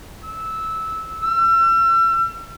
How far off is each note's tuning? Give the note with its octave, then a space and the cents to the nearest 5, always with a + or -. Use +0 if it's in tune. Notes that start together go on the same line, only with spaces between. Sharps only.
E6 -15
E6 +40